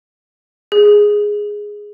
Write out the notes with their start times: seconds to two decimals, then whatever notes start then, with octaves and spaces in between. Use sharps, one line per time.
0.72 G#4